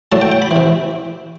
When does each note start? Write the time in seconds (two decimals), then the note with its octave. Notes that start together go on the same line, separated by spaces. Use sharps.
0.12 A2 F#3 A5
0.21 G5
0.32 G5
0.42 B5
0.51 C3 E3